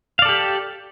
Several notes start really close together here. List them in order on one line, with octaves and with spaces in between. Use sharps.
F5 D5 A4 G4